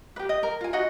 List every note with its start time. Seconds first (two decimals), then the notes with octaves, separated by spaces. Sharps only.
0.16 G4 B4
0.29 D#5
0.43 A#4
0.61 F4 G#5
0.73 D#4 F#4 D#5 F#5